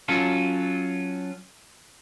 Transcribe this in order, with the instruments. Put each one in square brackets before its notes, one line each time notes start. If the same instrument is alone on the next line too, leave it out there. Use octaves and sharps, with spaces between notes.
[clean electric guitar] F#3 C#4 F4 A4